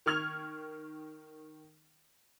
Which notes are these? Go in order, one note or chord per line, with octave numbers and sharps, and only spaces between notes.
D#3 C#6 F6 G#6 F7